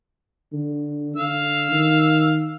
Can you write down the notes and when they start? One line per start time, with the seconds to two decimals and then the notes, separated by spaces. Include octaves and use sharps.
0.53 D3
1.16 D3 F5 E6
1.72 D#3